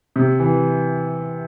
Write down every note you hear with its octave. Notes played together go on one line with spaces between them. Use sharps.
C3
E3